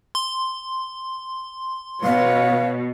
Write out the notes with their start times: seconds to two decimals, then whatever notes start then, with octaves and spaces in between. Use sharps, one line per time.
0.15 C6
2.04 B2 B4 C#5 F5